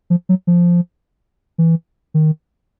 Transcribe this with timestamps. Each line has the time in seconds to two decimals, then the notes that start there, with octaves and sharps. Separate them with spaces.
0.10 F3
0.29 F#3
0.47 F3
1.58 E3
2.14 D#3